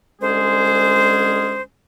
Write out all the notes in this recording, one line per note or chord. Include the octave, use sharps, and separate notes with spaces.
C2 D3 G#3 C#4 G#4 C5